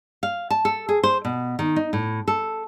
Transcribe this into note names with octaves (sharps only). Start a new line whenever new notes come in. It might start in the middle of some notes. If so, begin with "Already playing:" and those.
F5
A5
A4
G#4
C5
B2
D#3
D#4
A2
A4